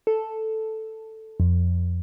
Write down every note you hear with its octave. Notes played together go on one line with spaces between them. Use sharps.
A4
F2